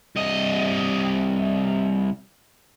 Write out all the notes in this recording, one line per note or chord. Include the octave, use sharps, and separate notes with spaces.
C2 D#5